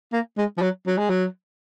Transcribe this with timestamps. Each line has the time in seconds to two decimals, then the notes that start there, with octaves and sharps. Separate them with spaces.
0.12 A#3
0.37 G#3
0.57 F3
0.62 F#3
0.87 F#3
0.98 G#3
1.09 F#3